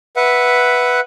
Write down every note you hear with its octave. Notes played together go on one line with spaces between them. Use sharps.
B4 E5 F#5